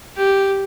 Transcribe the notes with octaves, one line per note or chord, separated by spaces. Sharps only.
G4